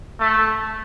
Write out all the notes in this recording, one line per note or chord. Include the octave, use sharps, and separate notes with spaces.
A3